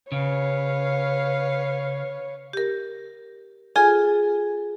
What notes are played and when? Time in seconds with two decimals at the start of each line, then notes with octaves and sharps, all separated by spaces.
0.12 C#3 B4 C#5 F5
2.53 G4 A#4
3.76 F4 G#4 A4 G#5